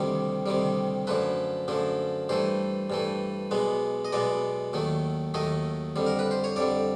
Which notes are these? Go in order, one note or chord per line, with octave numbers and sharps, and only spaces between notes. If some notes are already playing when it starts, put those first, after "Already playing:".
Already playing: D2 C3 D#3 G3
D2 C3 D#3 G3
F#2 D3 F3 A3 B4
F#2 D3 F3 A3
G2 E3 A3 C5
G2 E3 A3
B1 B2 G#3 B3
D#5
B1 B2 G#3 B3 D5
D#2 D#3 F#3 A3
D#2 D#3 F#3 A3 D#5
F2 D3 G3
A#4
B4
C5
C#5
F2 D3 G3 D5